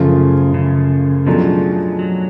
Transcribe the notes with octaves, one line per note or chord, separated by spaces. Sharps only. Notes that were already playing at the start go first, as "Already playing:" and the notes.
Already playing: F#2 C#3 F3 A3 F4 G#4
C#3
B2 F3 F#3 A3 D4 G#4
F#3